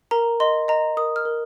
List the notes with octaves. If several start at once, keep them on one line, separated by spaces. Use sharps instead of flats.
A#4 A#5
D#5 C6
D#5 A#5
A#4 D#6
F6
A#4